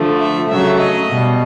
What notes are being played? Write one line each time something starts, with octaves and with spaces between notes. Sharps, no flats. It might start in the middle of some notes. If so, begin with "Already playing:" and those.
Already playing: D3 F3 A3
E5
C#3 F#3 A3 E5
D#5
B2 G3